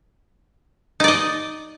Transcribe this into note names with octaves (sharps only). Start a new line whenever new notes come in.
D#4 D5 D#5